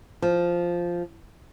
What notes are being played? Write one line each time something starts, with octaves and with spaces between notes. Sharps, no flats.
F3